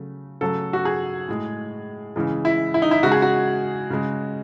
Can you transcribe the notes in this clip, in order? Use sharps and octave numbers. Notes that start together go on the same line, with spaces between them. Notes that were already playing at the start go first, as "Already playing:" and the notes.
Already playing: C#3 F#3 A3
C#3 F#3 A3 A4
F#4
G#4
A2 G#3
C#3 E3 G#3
E4
E4
D#4
E4
C#3 G#3 F#4
G#4
F#4
C#3 G#3